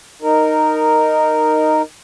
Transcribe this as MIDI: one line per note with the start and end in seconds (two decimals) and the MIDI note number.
0.22 1.82 63
0.22 1.82 70